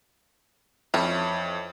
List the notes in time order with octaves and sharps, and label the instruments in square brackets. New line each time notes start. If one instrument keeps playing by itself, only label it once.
[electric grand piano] F2 [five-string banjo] E3 C#4